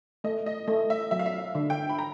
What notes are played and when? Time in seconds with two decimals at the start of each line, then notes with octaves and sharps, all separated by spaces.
0.24 A3 D#5
0.46 D#5
0.68 A3 D#5
0.90 E5
1.11 F#3 E5
1.19 F5
1.26 E5
1.55 D3
1.70 G5
1.89 B5
1.98 A#5